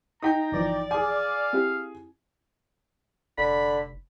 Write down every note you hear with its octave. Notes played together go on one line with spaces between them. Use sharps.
D#4 G5 A#5 D#6 B6 C7
G1 E3 F3 D5
G#4 F5 G#5
C4 E4 G4
F1 D3 B5